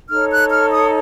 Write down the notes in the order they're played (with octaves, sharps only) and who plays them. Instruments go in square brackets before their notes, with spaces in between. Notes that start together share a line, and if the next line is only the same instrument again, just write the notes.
[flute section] D#4 A4 C#5 F6
F#6
F6
D#6